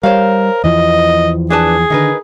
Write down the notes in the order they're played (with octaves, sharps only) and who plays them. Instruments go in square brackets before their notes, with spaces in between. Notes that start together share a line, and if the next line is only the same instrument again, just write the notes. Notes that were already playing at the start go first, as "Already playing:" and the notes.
[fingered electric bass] G3 [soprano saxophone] A#4 [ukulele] C5 C#5 F5
[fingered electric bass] E2 E3 F3 [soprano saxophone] D#5
[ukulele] D4 B4 A5 [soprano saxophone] G#4
[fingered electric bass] D3 D#3 [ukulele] D#4 A#4 B4